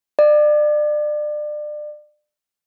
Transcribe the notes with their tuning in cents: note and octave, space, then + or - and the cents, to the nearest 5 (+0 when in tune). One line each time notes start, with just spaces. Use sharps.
D5 +30